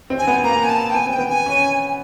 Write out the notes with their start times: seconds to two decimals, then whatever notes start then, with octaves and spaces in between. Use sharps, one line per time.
0.10 C4
0.18 G#5
0.27 B3
0.44 A#3 A#5
0.63 G#5
0.69 A5
0.90 G5
0.95 B3 G#5
1.06 C4
1.12 G5
1.18 B3
1.29 G#5
1.46 C#4